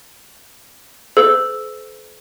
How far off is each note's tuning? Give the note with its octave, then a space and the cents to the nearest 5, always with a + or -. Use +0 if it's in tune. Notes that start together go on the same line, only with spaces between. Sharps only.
A4 -45 C5 -40 E6 +0